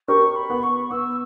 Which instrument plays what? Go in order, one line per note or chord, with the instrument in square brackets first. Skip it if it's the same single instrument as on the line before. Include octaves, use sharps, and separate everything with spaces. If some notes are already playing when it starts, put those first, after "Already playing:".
[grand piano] G4 A#4 [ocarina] C#6
[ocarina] B5
[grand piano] B3
[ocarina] C#6
[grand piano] B3 [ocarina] E6